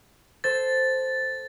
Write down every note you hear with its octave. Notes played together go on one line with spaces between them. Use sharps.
A4 C5 A6